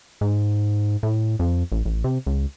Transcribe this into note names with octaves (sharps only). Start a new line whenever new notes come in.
G#2
A2
F2
A1
A1
C3
C#2